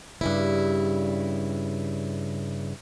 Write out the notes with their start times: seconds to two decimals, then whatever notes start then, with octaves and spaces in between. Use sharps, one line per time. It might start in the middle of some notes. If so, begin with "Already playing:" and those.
0.21 G2 C#3 E4